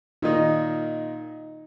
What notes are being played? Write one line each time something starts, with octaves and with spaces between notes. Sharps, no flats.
A#2 D#3 D#4 D#5